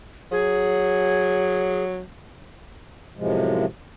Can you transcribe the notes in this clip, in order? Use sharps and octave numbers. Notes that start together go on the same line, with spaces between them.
F#3 G#4
F#2 A2 C3 F3 G#3